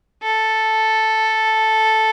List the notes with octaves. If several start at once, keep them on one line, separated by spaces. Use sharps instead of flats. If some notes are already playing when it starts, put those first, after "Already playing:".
A4